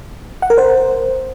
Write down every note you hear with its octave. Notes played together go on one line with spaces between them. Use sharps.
F#5
A#4
C5